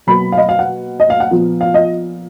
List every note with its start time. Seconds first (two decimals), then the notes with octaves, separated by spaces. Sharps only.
0.07 B2 F#3 A#3 B5
0.32 F5
0.37 D#5
0.49 F5
0.59 F#5
1.00 D#5
1.10 F5
1.20 F#5
1.31 A#2 F3 B3
1.61 F5
1.74 D#5